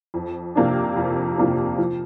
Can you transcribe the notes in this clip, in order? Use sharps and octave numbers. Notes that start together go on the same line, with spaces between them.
F2
C3 F3 A#3 D4
F2
C3 F3 A#3 D4
F3